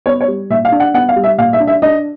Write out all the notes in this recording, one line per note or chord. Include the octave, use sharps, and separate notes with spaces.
B3 C#5
C#5
G3
A#2 E5
F5
D4
F#5
B3 F#5
F5
G3
E5
A#2 F5
E5
D4
E5
D4 D#5